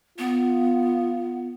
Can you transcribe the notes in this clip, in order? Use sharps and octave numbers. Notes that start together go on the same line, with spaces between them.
B3 F4